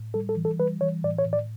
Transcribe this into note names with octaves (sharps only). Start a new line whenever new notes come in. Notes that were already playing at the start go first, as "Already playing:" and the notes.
Already playing: A2
G3 A4
A4
E3
A4
G3 B4
E3 C#5
A2 D5
C#5
A2
D5